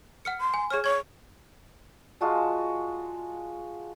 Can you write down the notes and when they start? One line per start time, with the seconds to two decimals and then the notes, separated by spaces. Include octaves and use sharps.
0.25 F#5 F6 C#7
0.40 C6
0.54 G#5
0.70 G#4 C#5 F6
0.84 C#5 C#6 G#6
2.21 G#3 F4 F#4 A5